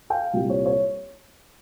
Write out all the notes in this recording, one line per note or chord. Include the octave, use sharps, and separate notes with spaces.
F5 G5
C2 A#2 G3
C#5
C#5